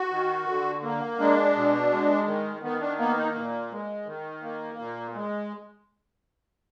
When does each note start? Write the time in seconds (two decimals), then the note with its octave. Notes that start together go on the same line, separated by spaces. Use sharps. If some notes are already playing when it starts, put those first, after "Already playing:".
Already playing: F#4
0.11 D#3
0.48 D3
0.83 A#3
1.19 G#3 D4
1.56 B2
1.91 G#3
2.27 D#3
2.63 D#3 B3
2.80 D4
2.99 A#3 B3
3.17 D#4
3.35 A#2
3.71 G#3
4.06 D#3
4.43 A#3
4.79 A#2
5.14 G#3